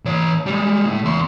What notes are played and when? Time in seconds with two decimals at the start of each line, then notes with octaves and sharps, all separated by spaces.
0.05 E3 C#5
0.46 G3 G#3
0.86 A2
1.04 E2 C6